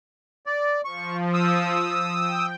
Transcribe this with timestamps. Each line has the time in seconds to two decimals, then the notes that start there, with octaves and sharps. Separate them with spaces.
0.46 D5
0.85 F3 C#6
1.34 D#6 E6
2.14 G5